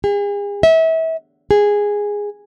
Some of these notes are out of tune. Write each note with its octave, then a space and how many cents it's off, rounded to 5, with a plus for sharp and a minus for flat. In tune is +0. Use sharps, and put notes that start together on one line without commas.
G#4 -40
E5 -30
G#4 -10